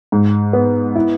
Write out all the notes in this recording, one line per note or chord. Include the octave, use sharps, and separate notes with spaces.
G#2
B3
E4